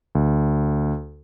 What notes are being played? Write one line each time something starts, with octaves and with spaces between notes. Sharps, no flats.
D2